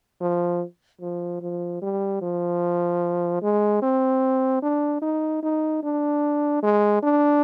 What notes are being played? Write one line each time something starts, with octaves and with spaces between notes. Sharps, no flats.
F3
F3
F3
G3
F3
G#3
C4
D4
D#4
D#4
D4
G#3
D4